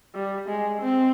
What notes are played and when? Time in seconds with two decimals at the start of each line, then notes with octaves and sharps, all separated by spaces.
0.15 G3
0.48 G#3
0.81 C4